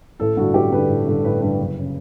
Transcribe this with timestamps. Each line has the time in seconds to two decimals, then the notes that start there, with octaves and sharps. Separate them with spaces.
0.20 A1 A4
0.37 G2 D3 F#4
0.54 A1 G4
0.72 G2 D3 B4
0.89 A1
1.06 G2 D3
1.24 A1 B4
1.41 G2 D3 B4
1.58 F#1
1.79 C#3